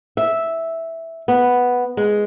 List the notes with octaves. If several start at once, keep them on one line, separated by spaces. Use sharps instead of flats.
E5
B3
G#3